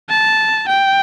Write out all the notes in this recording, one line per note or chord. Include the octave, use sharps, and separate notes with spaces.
A5
G5